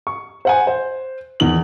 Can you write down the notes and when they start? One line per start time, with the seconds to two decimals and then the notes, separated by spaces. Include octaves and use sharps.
0.07 C#6
0.45 C5 F#5 G#5
0.67 C5
1.40 E2 D#3 F#7